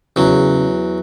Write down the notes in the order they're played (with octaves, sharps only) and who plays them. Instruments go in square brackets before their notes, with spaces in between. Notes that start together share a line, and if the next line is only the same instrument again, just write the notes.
[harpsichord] E2 F#3 [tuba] C#3